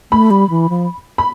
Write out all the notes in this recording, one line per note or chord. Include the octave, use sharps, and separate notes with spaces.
A3 B5
G3
E3
F3
B5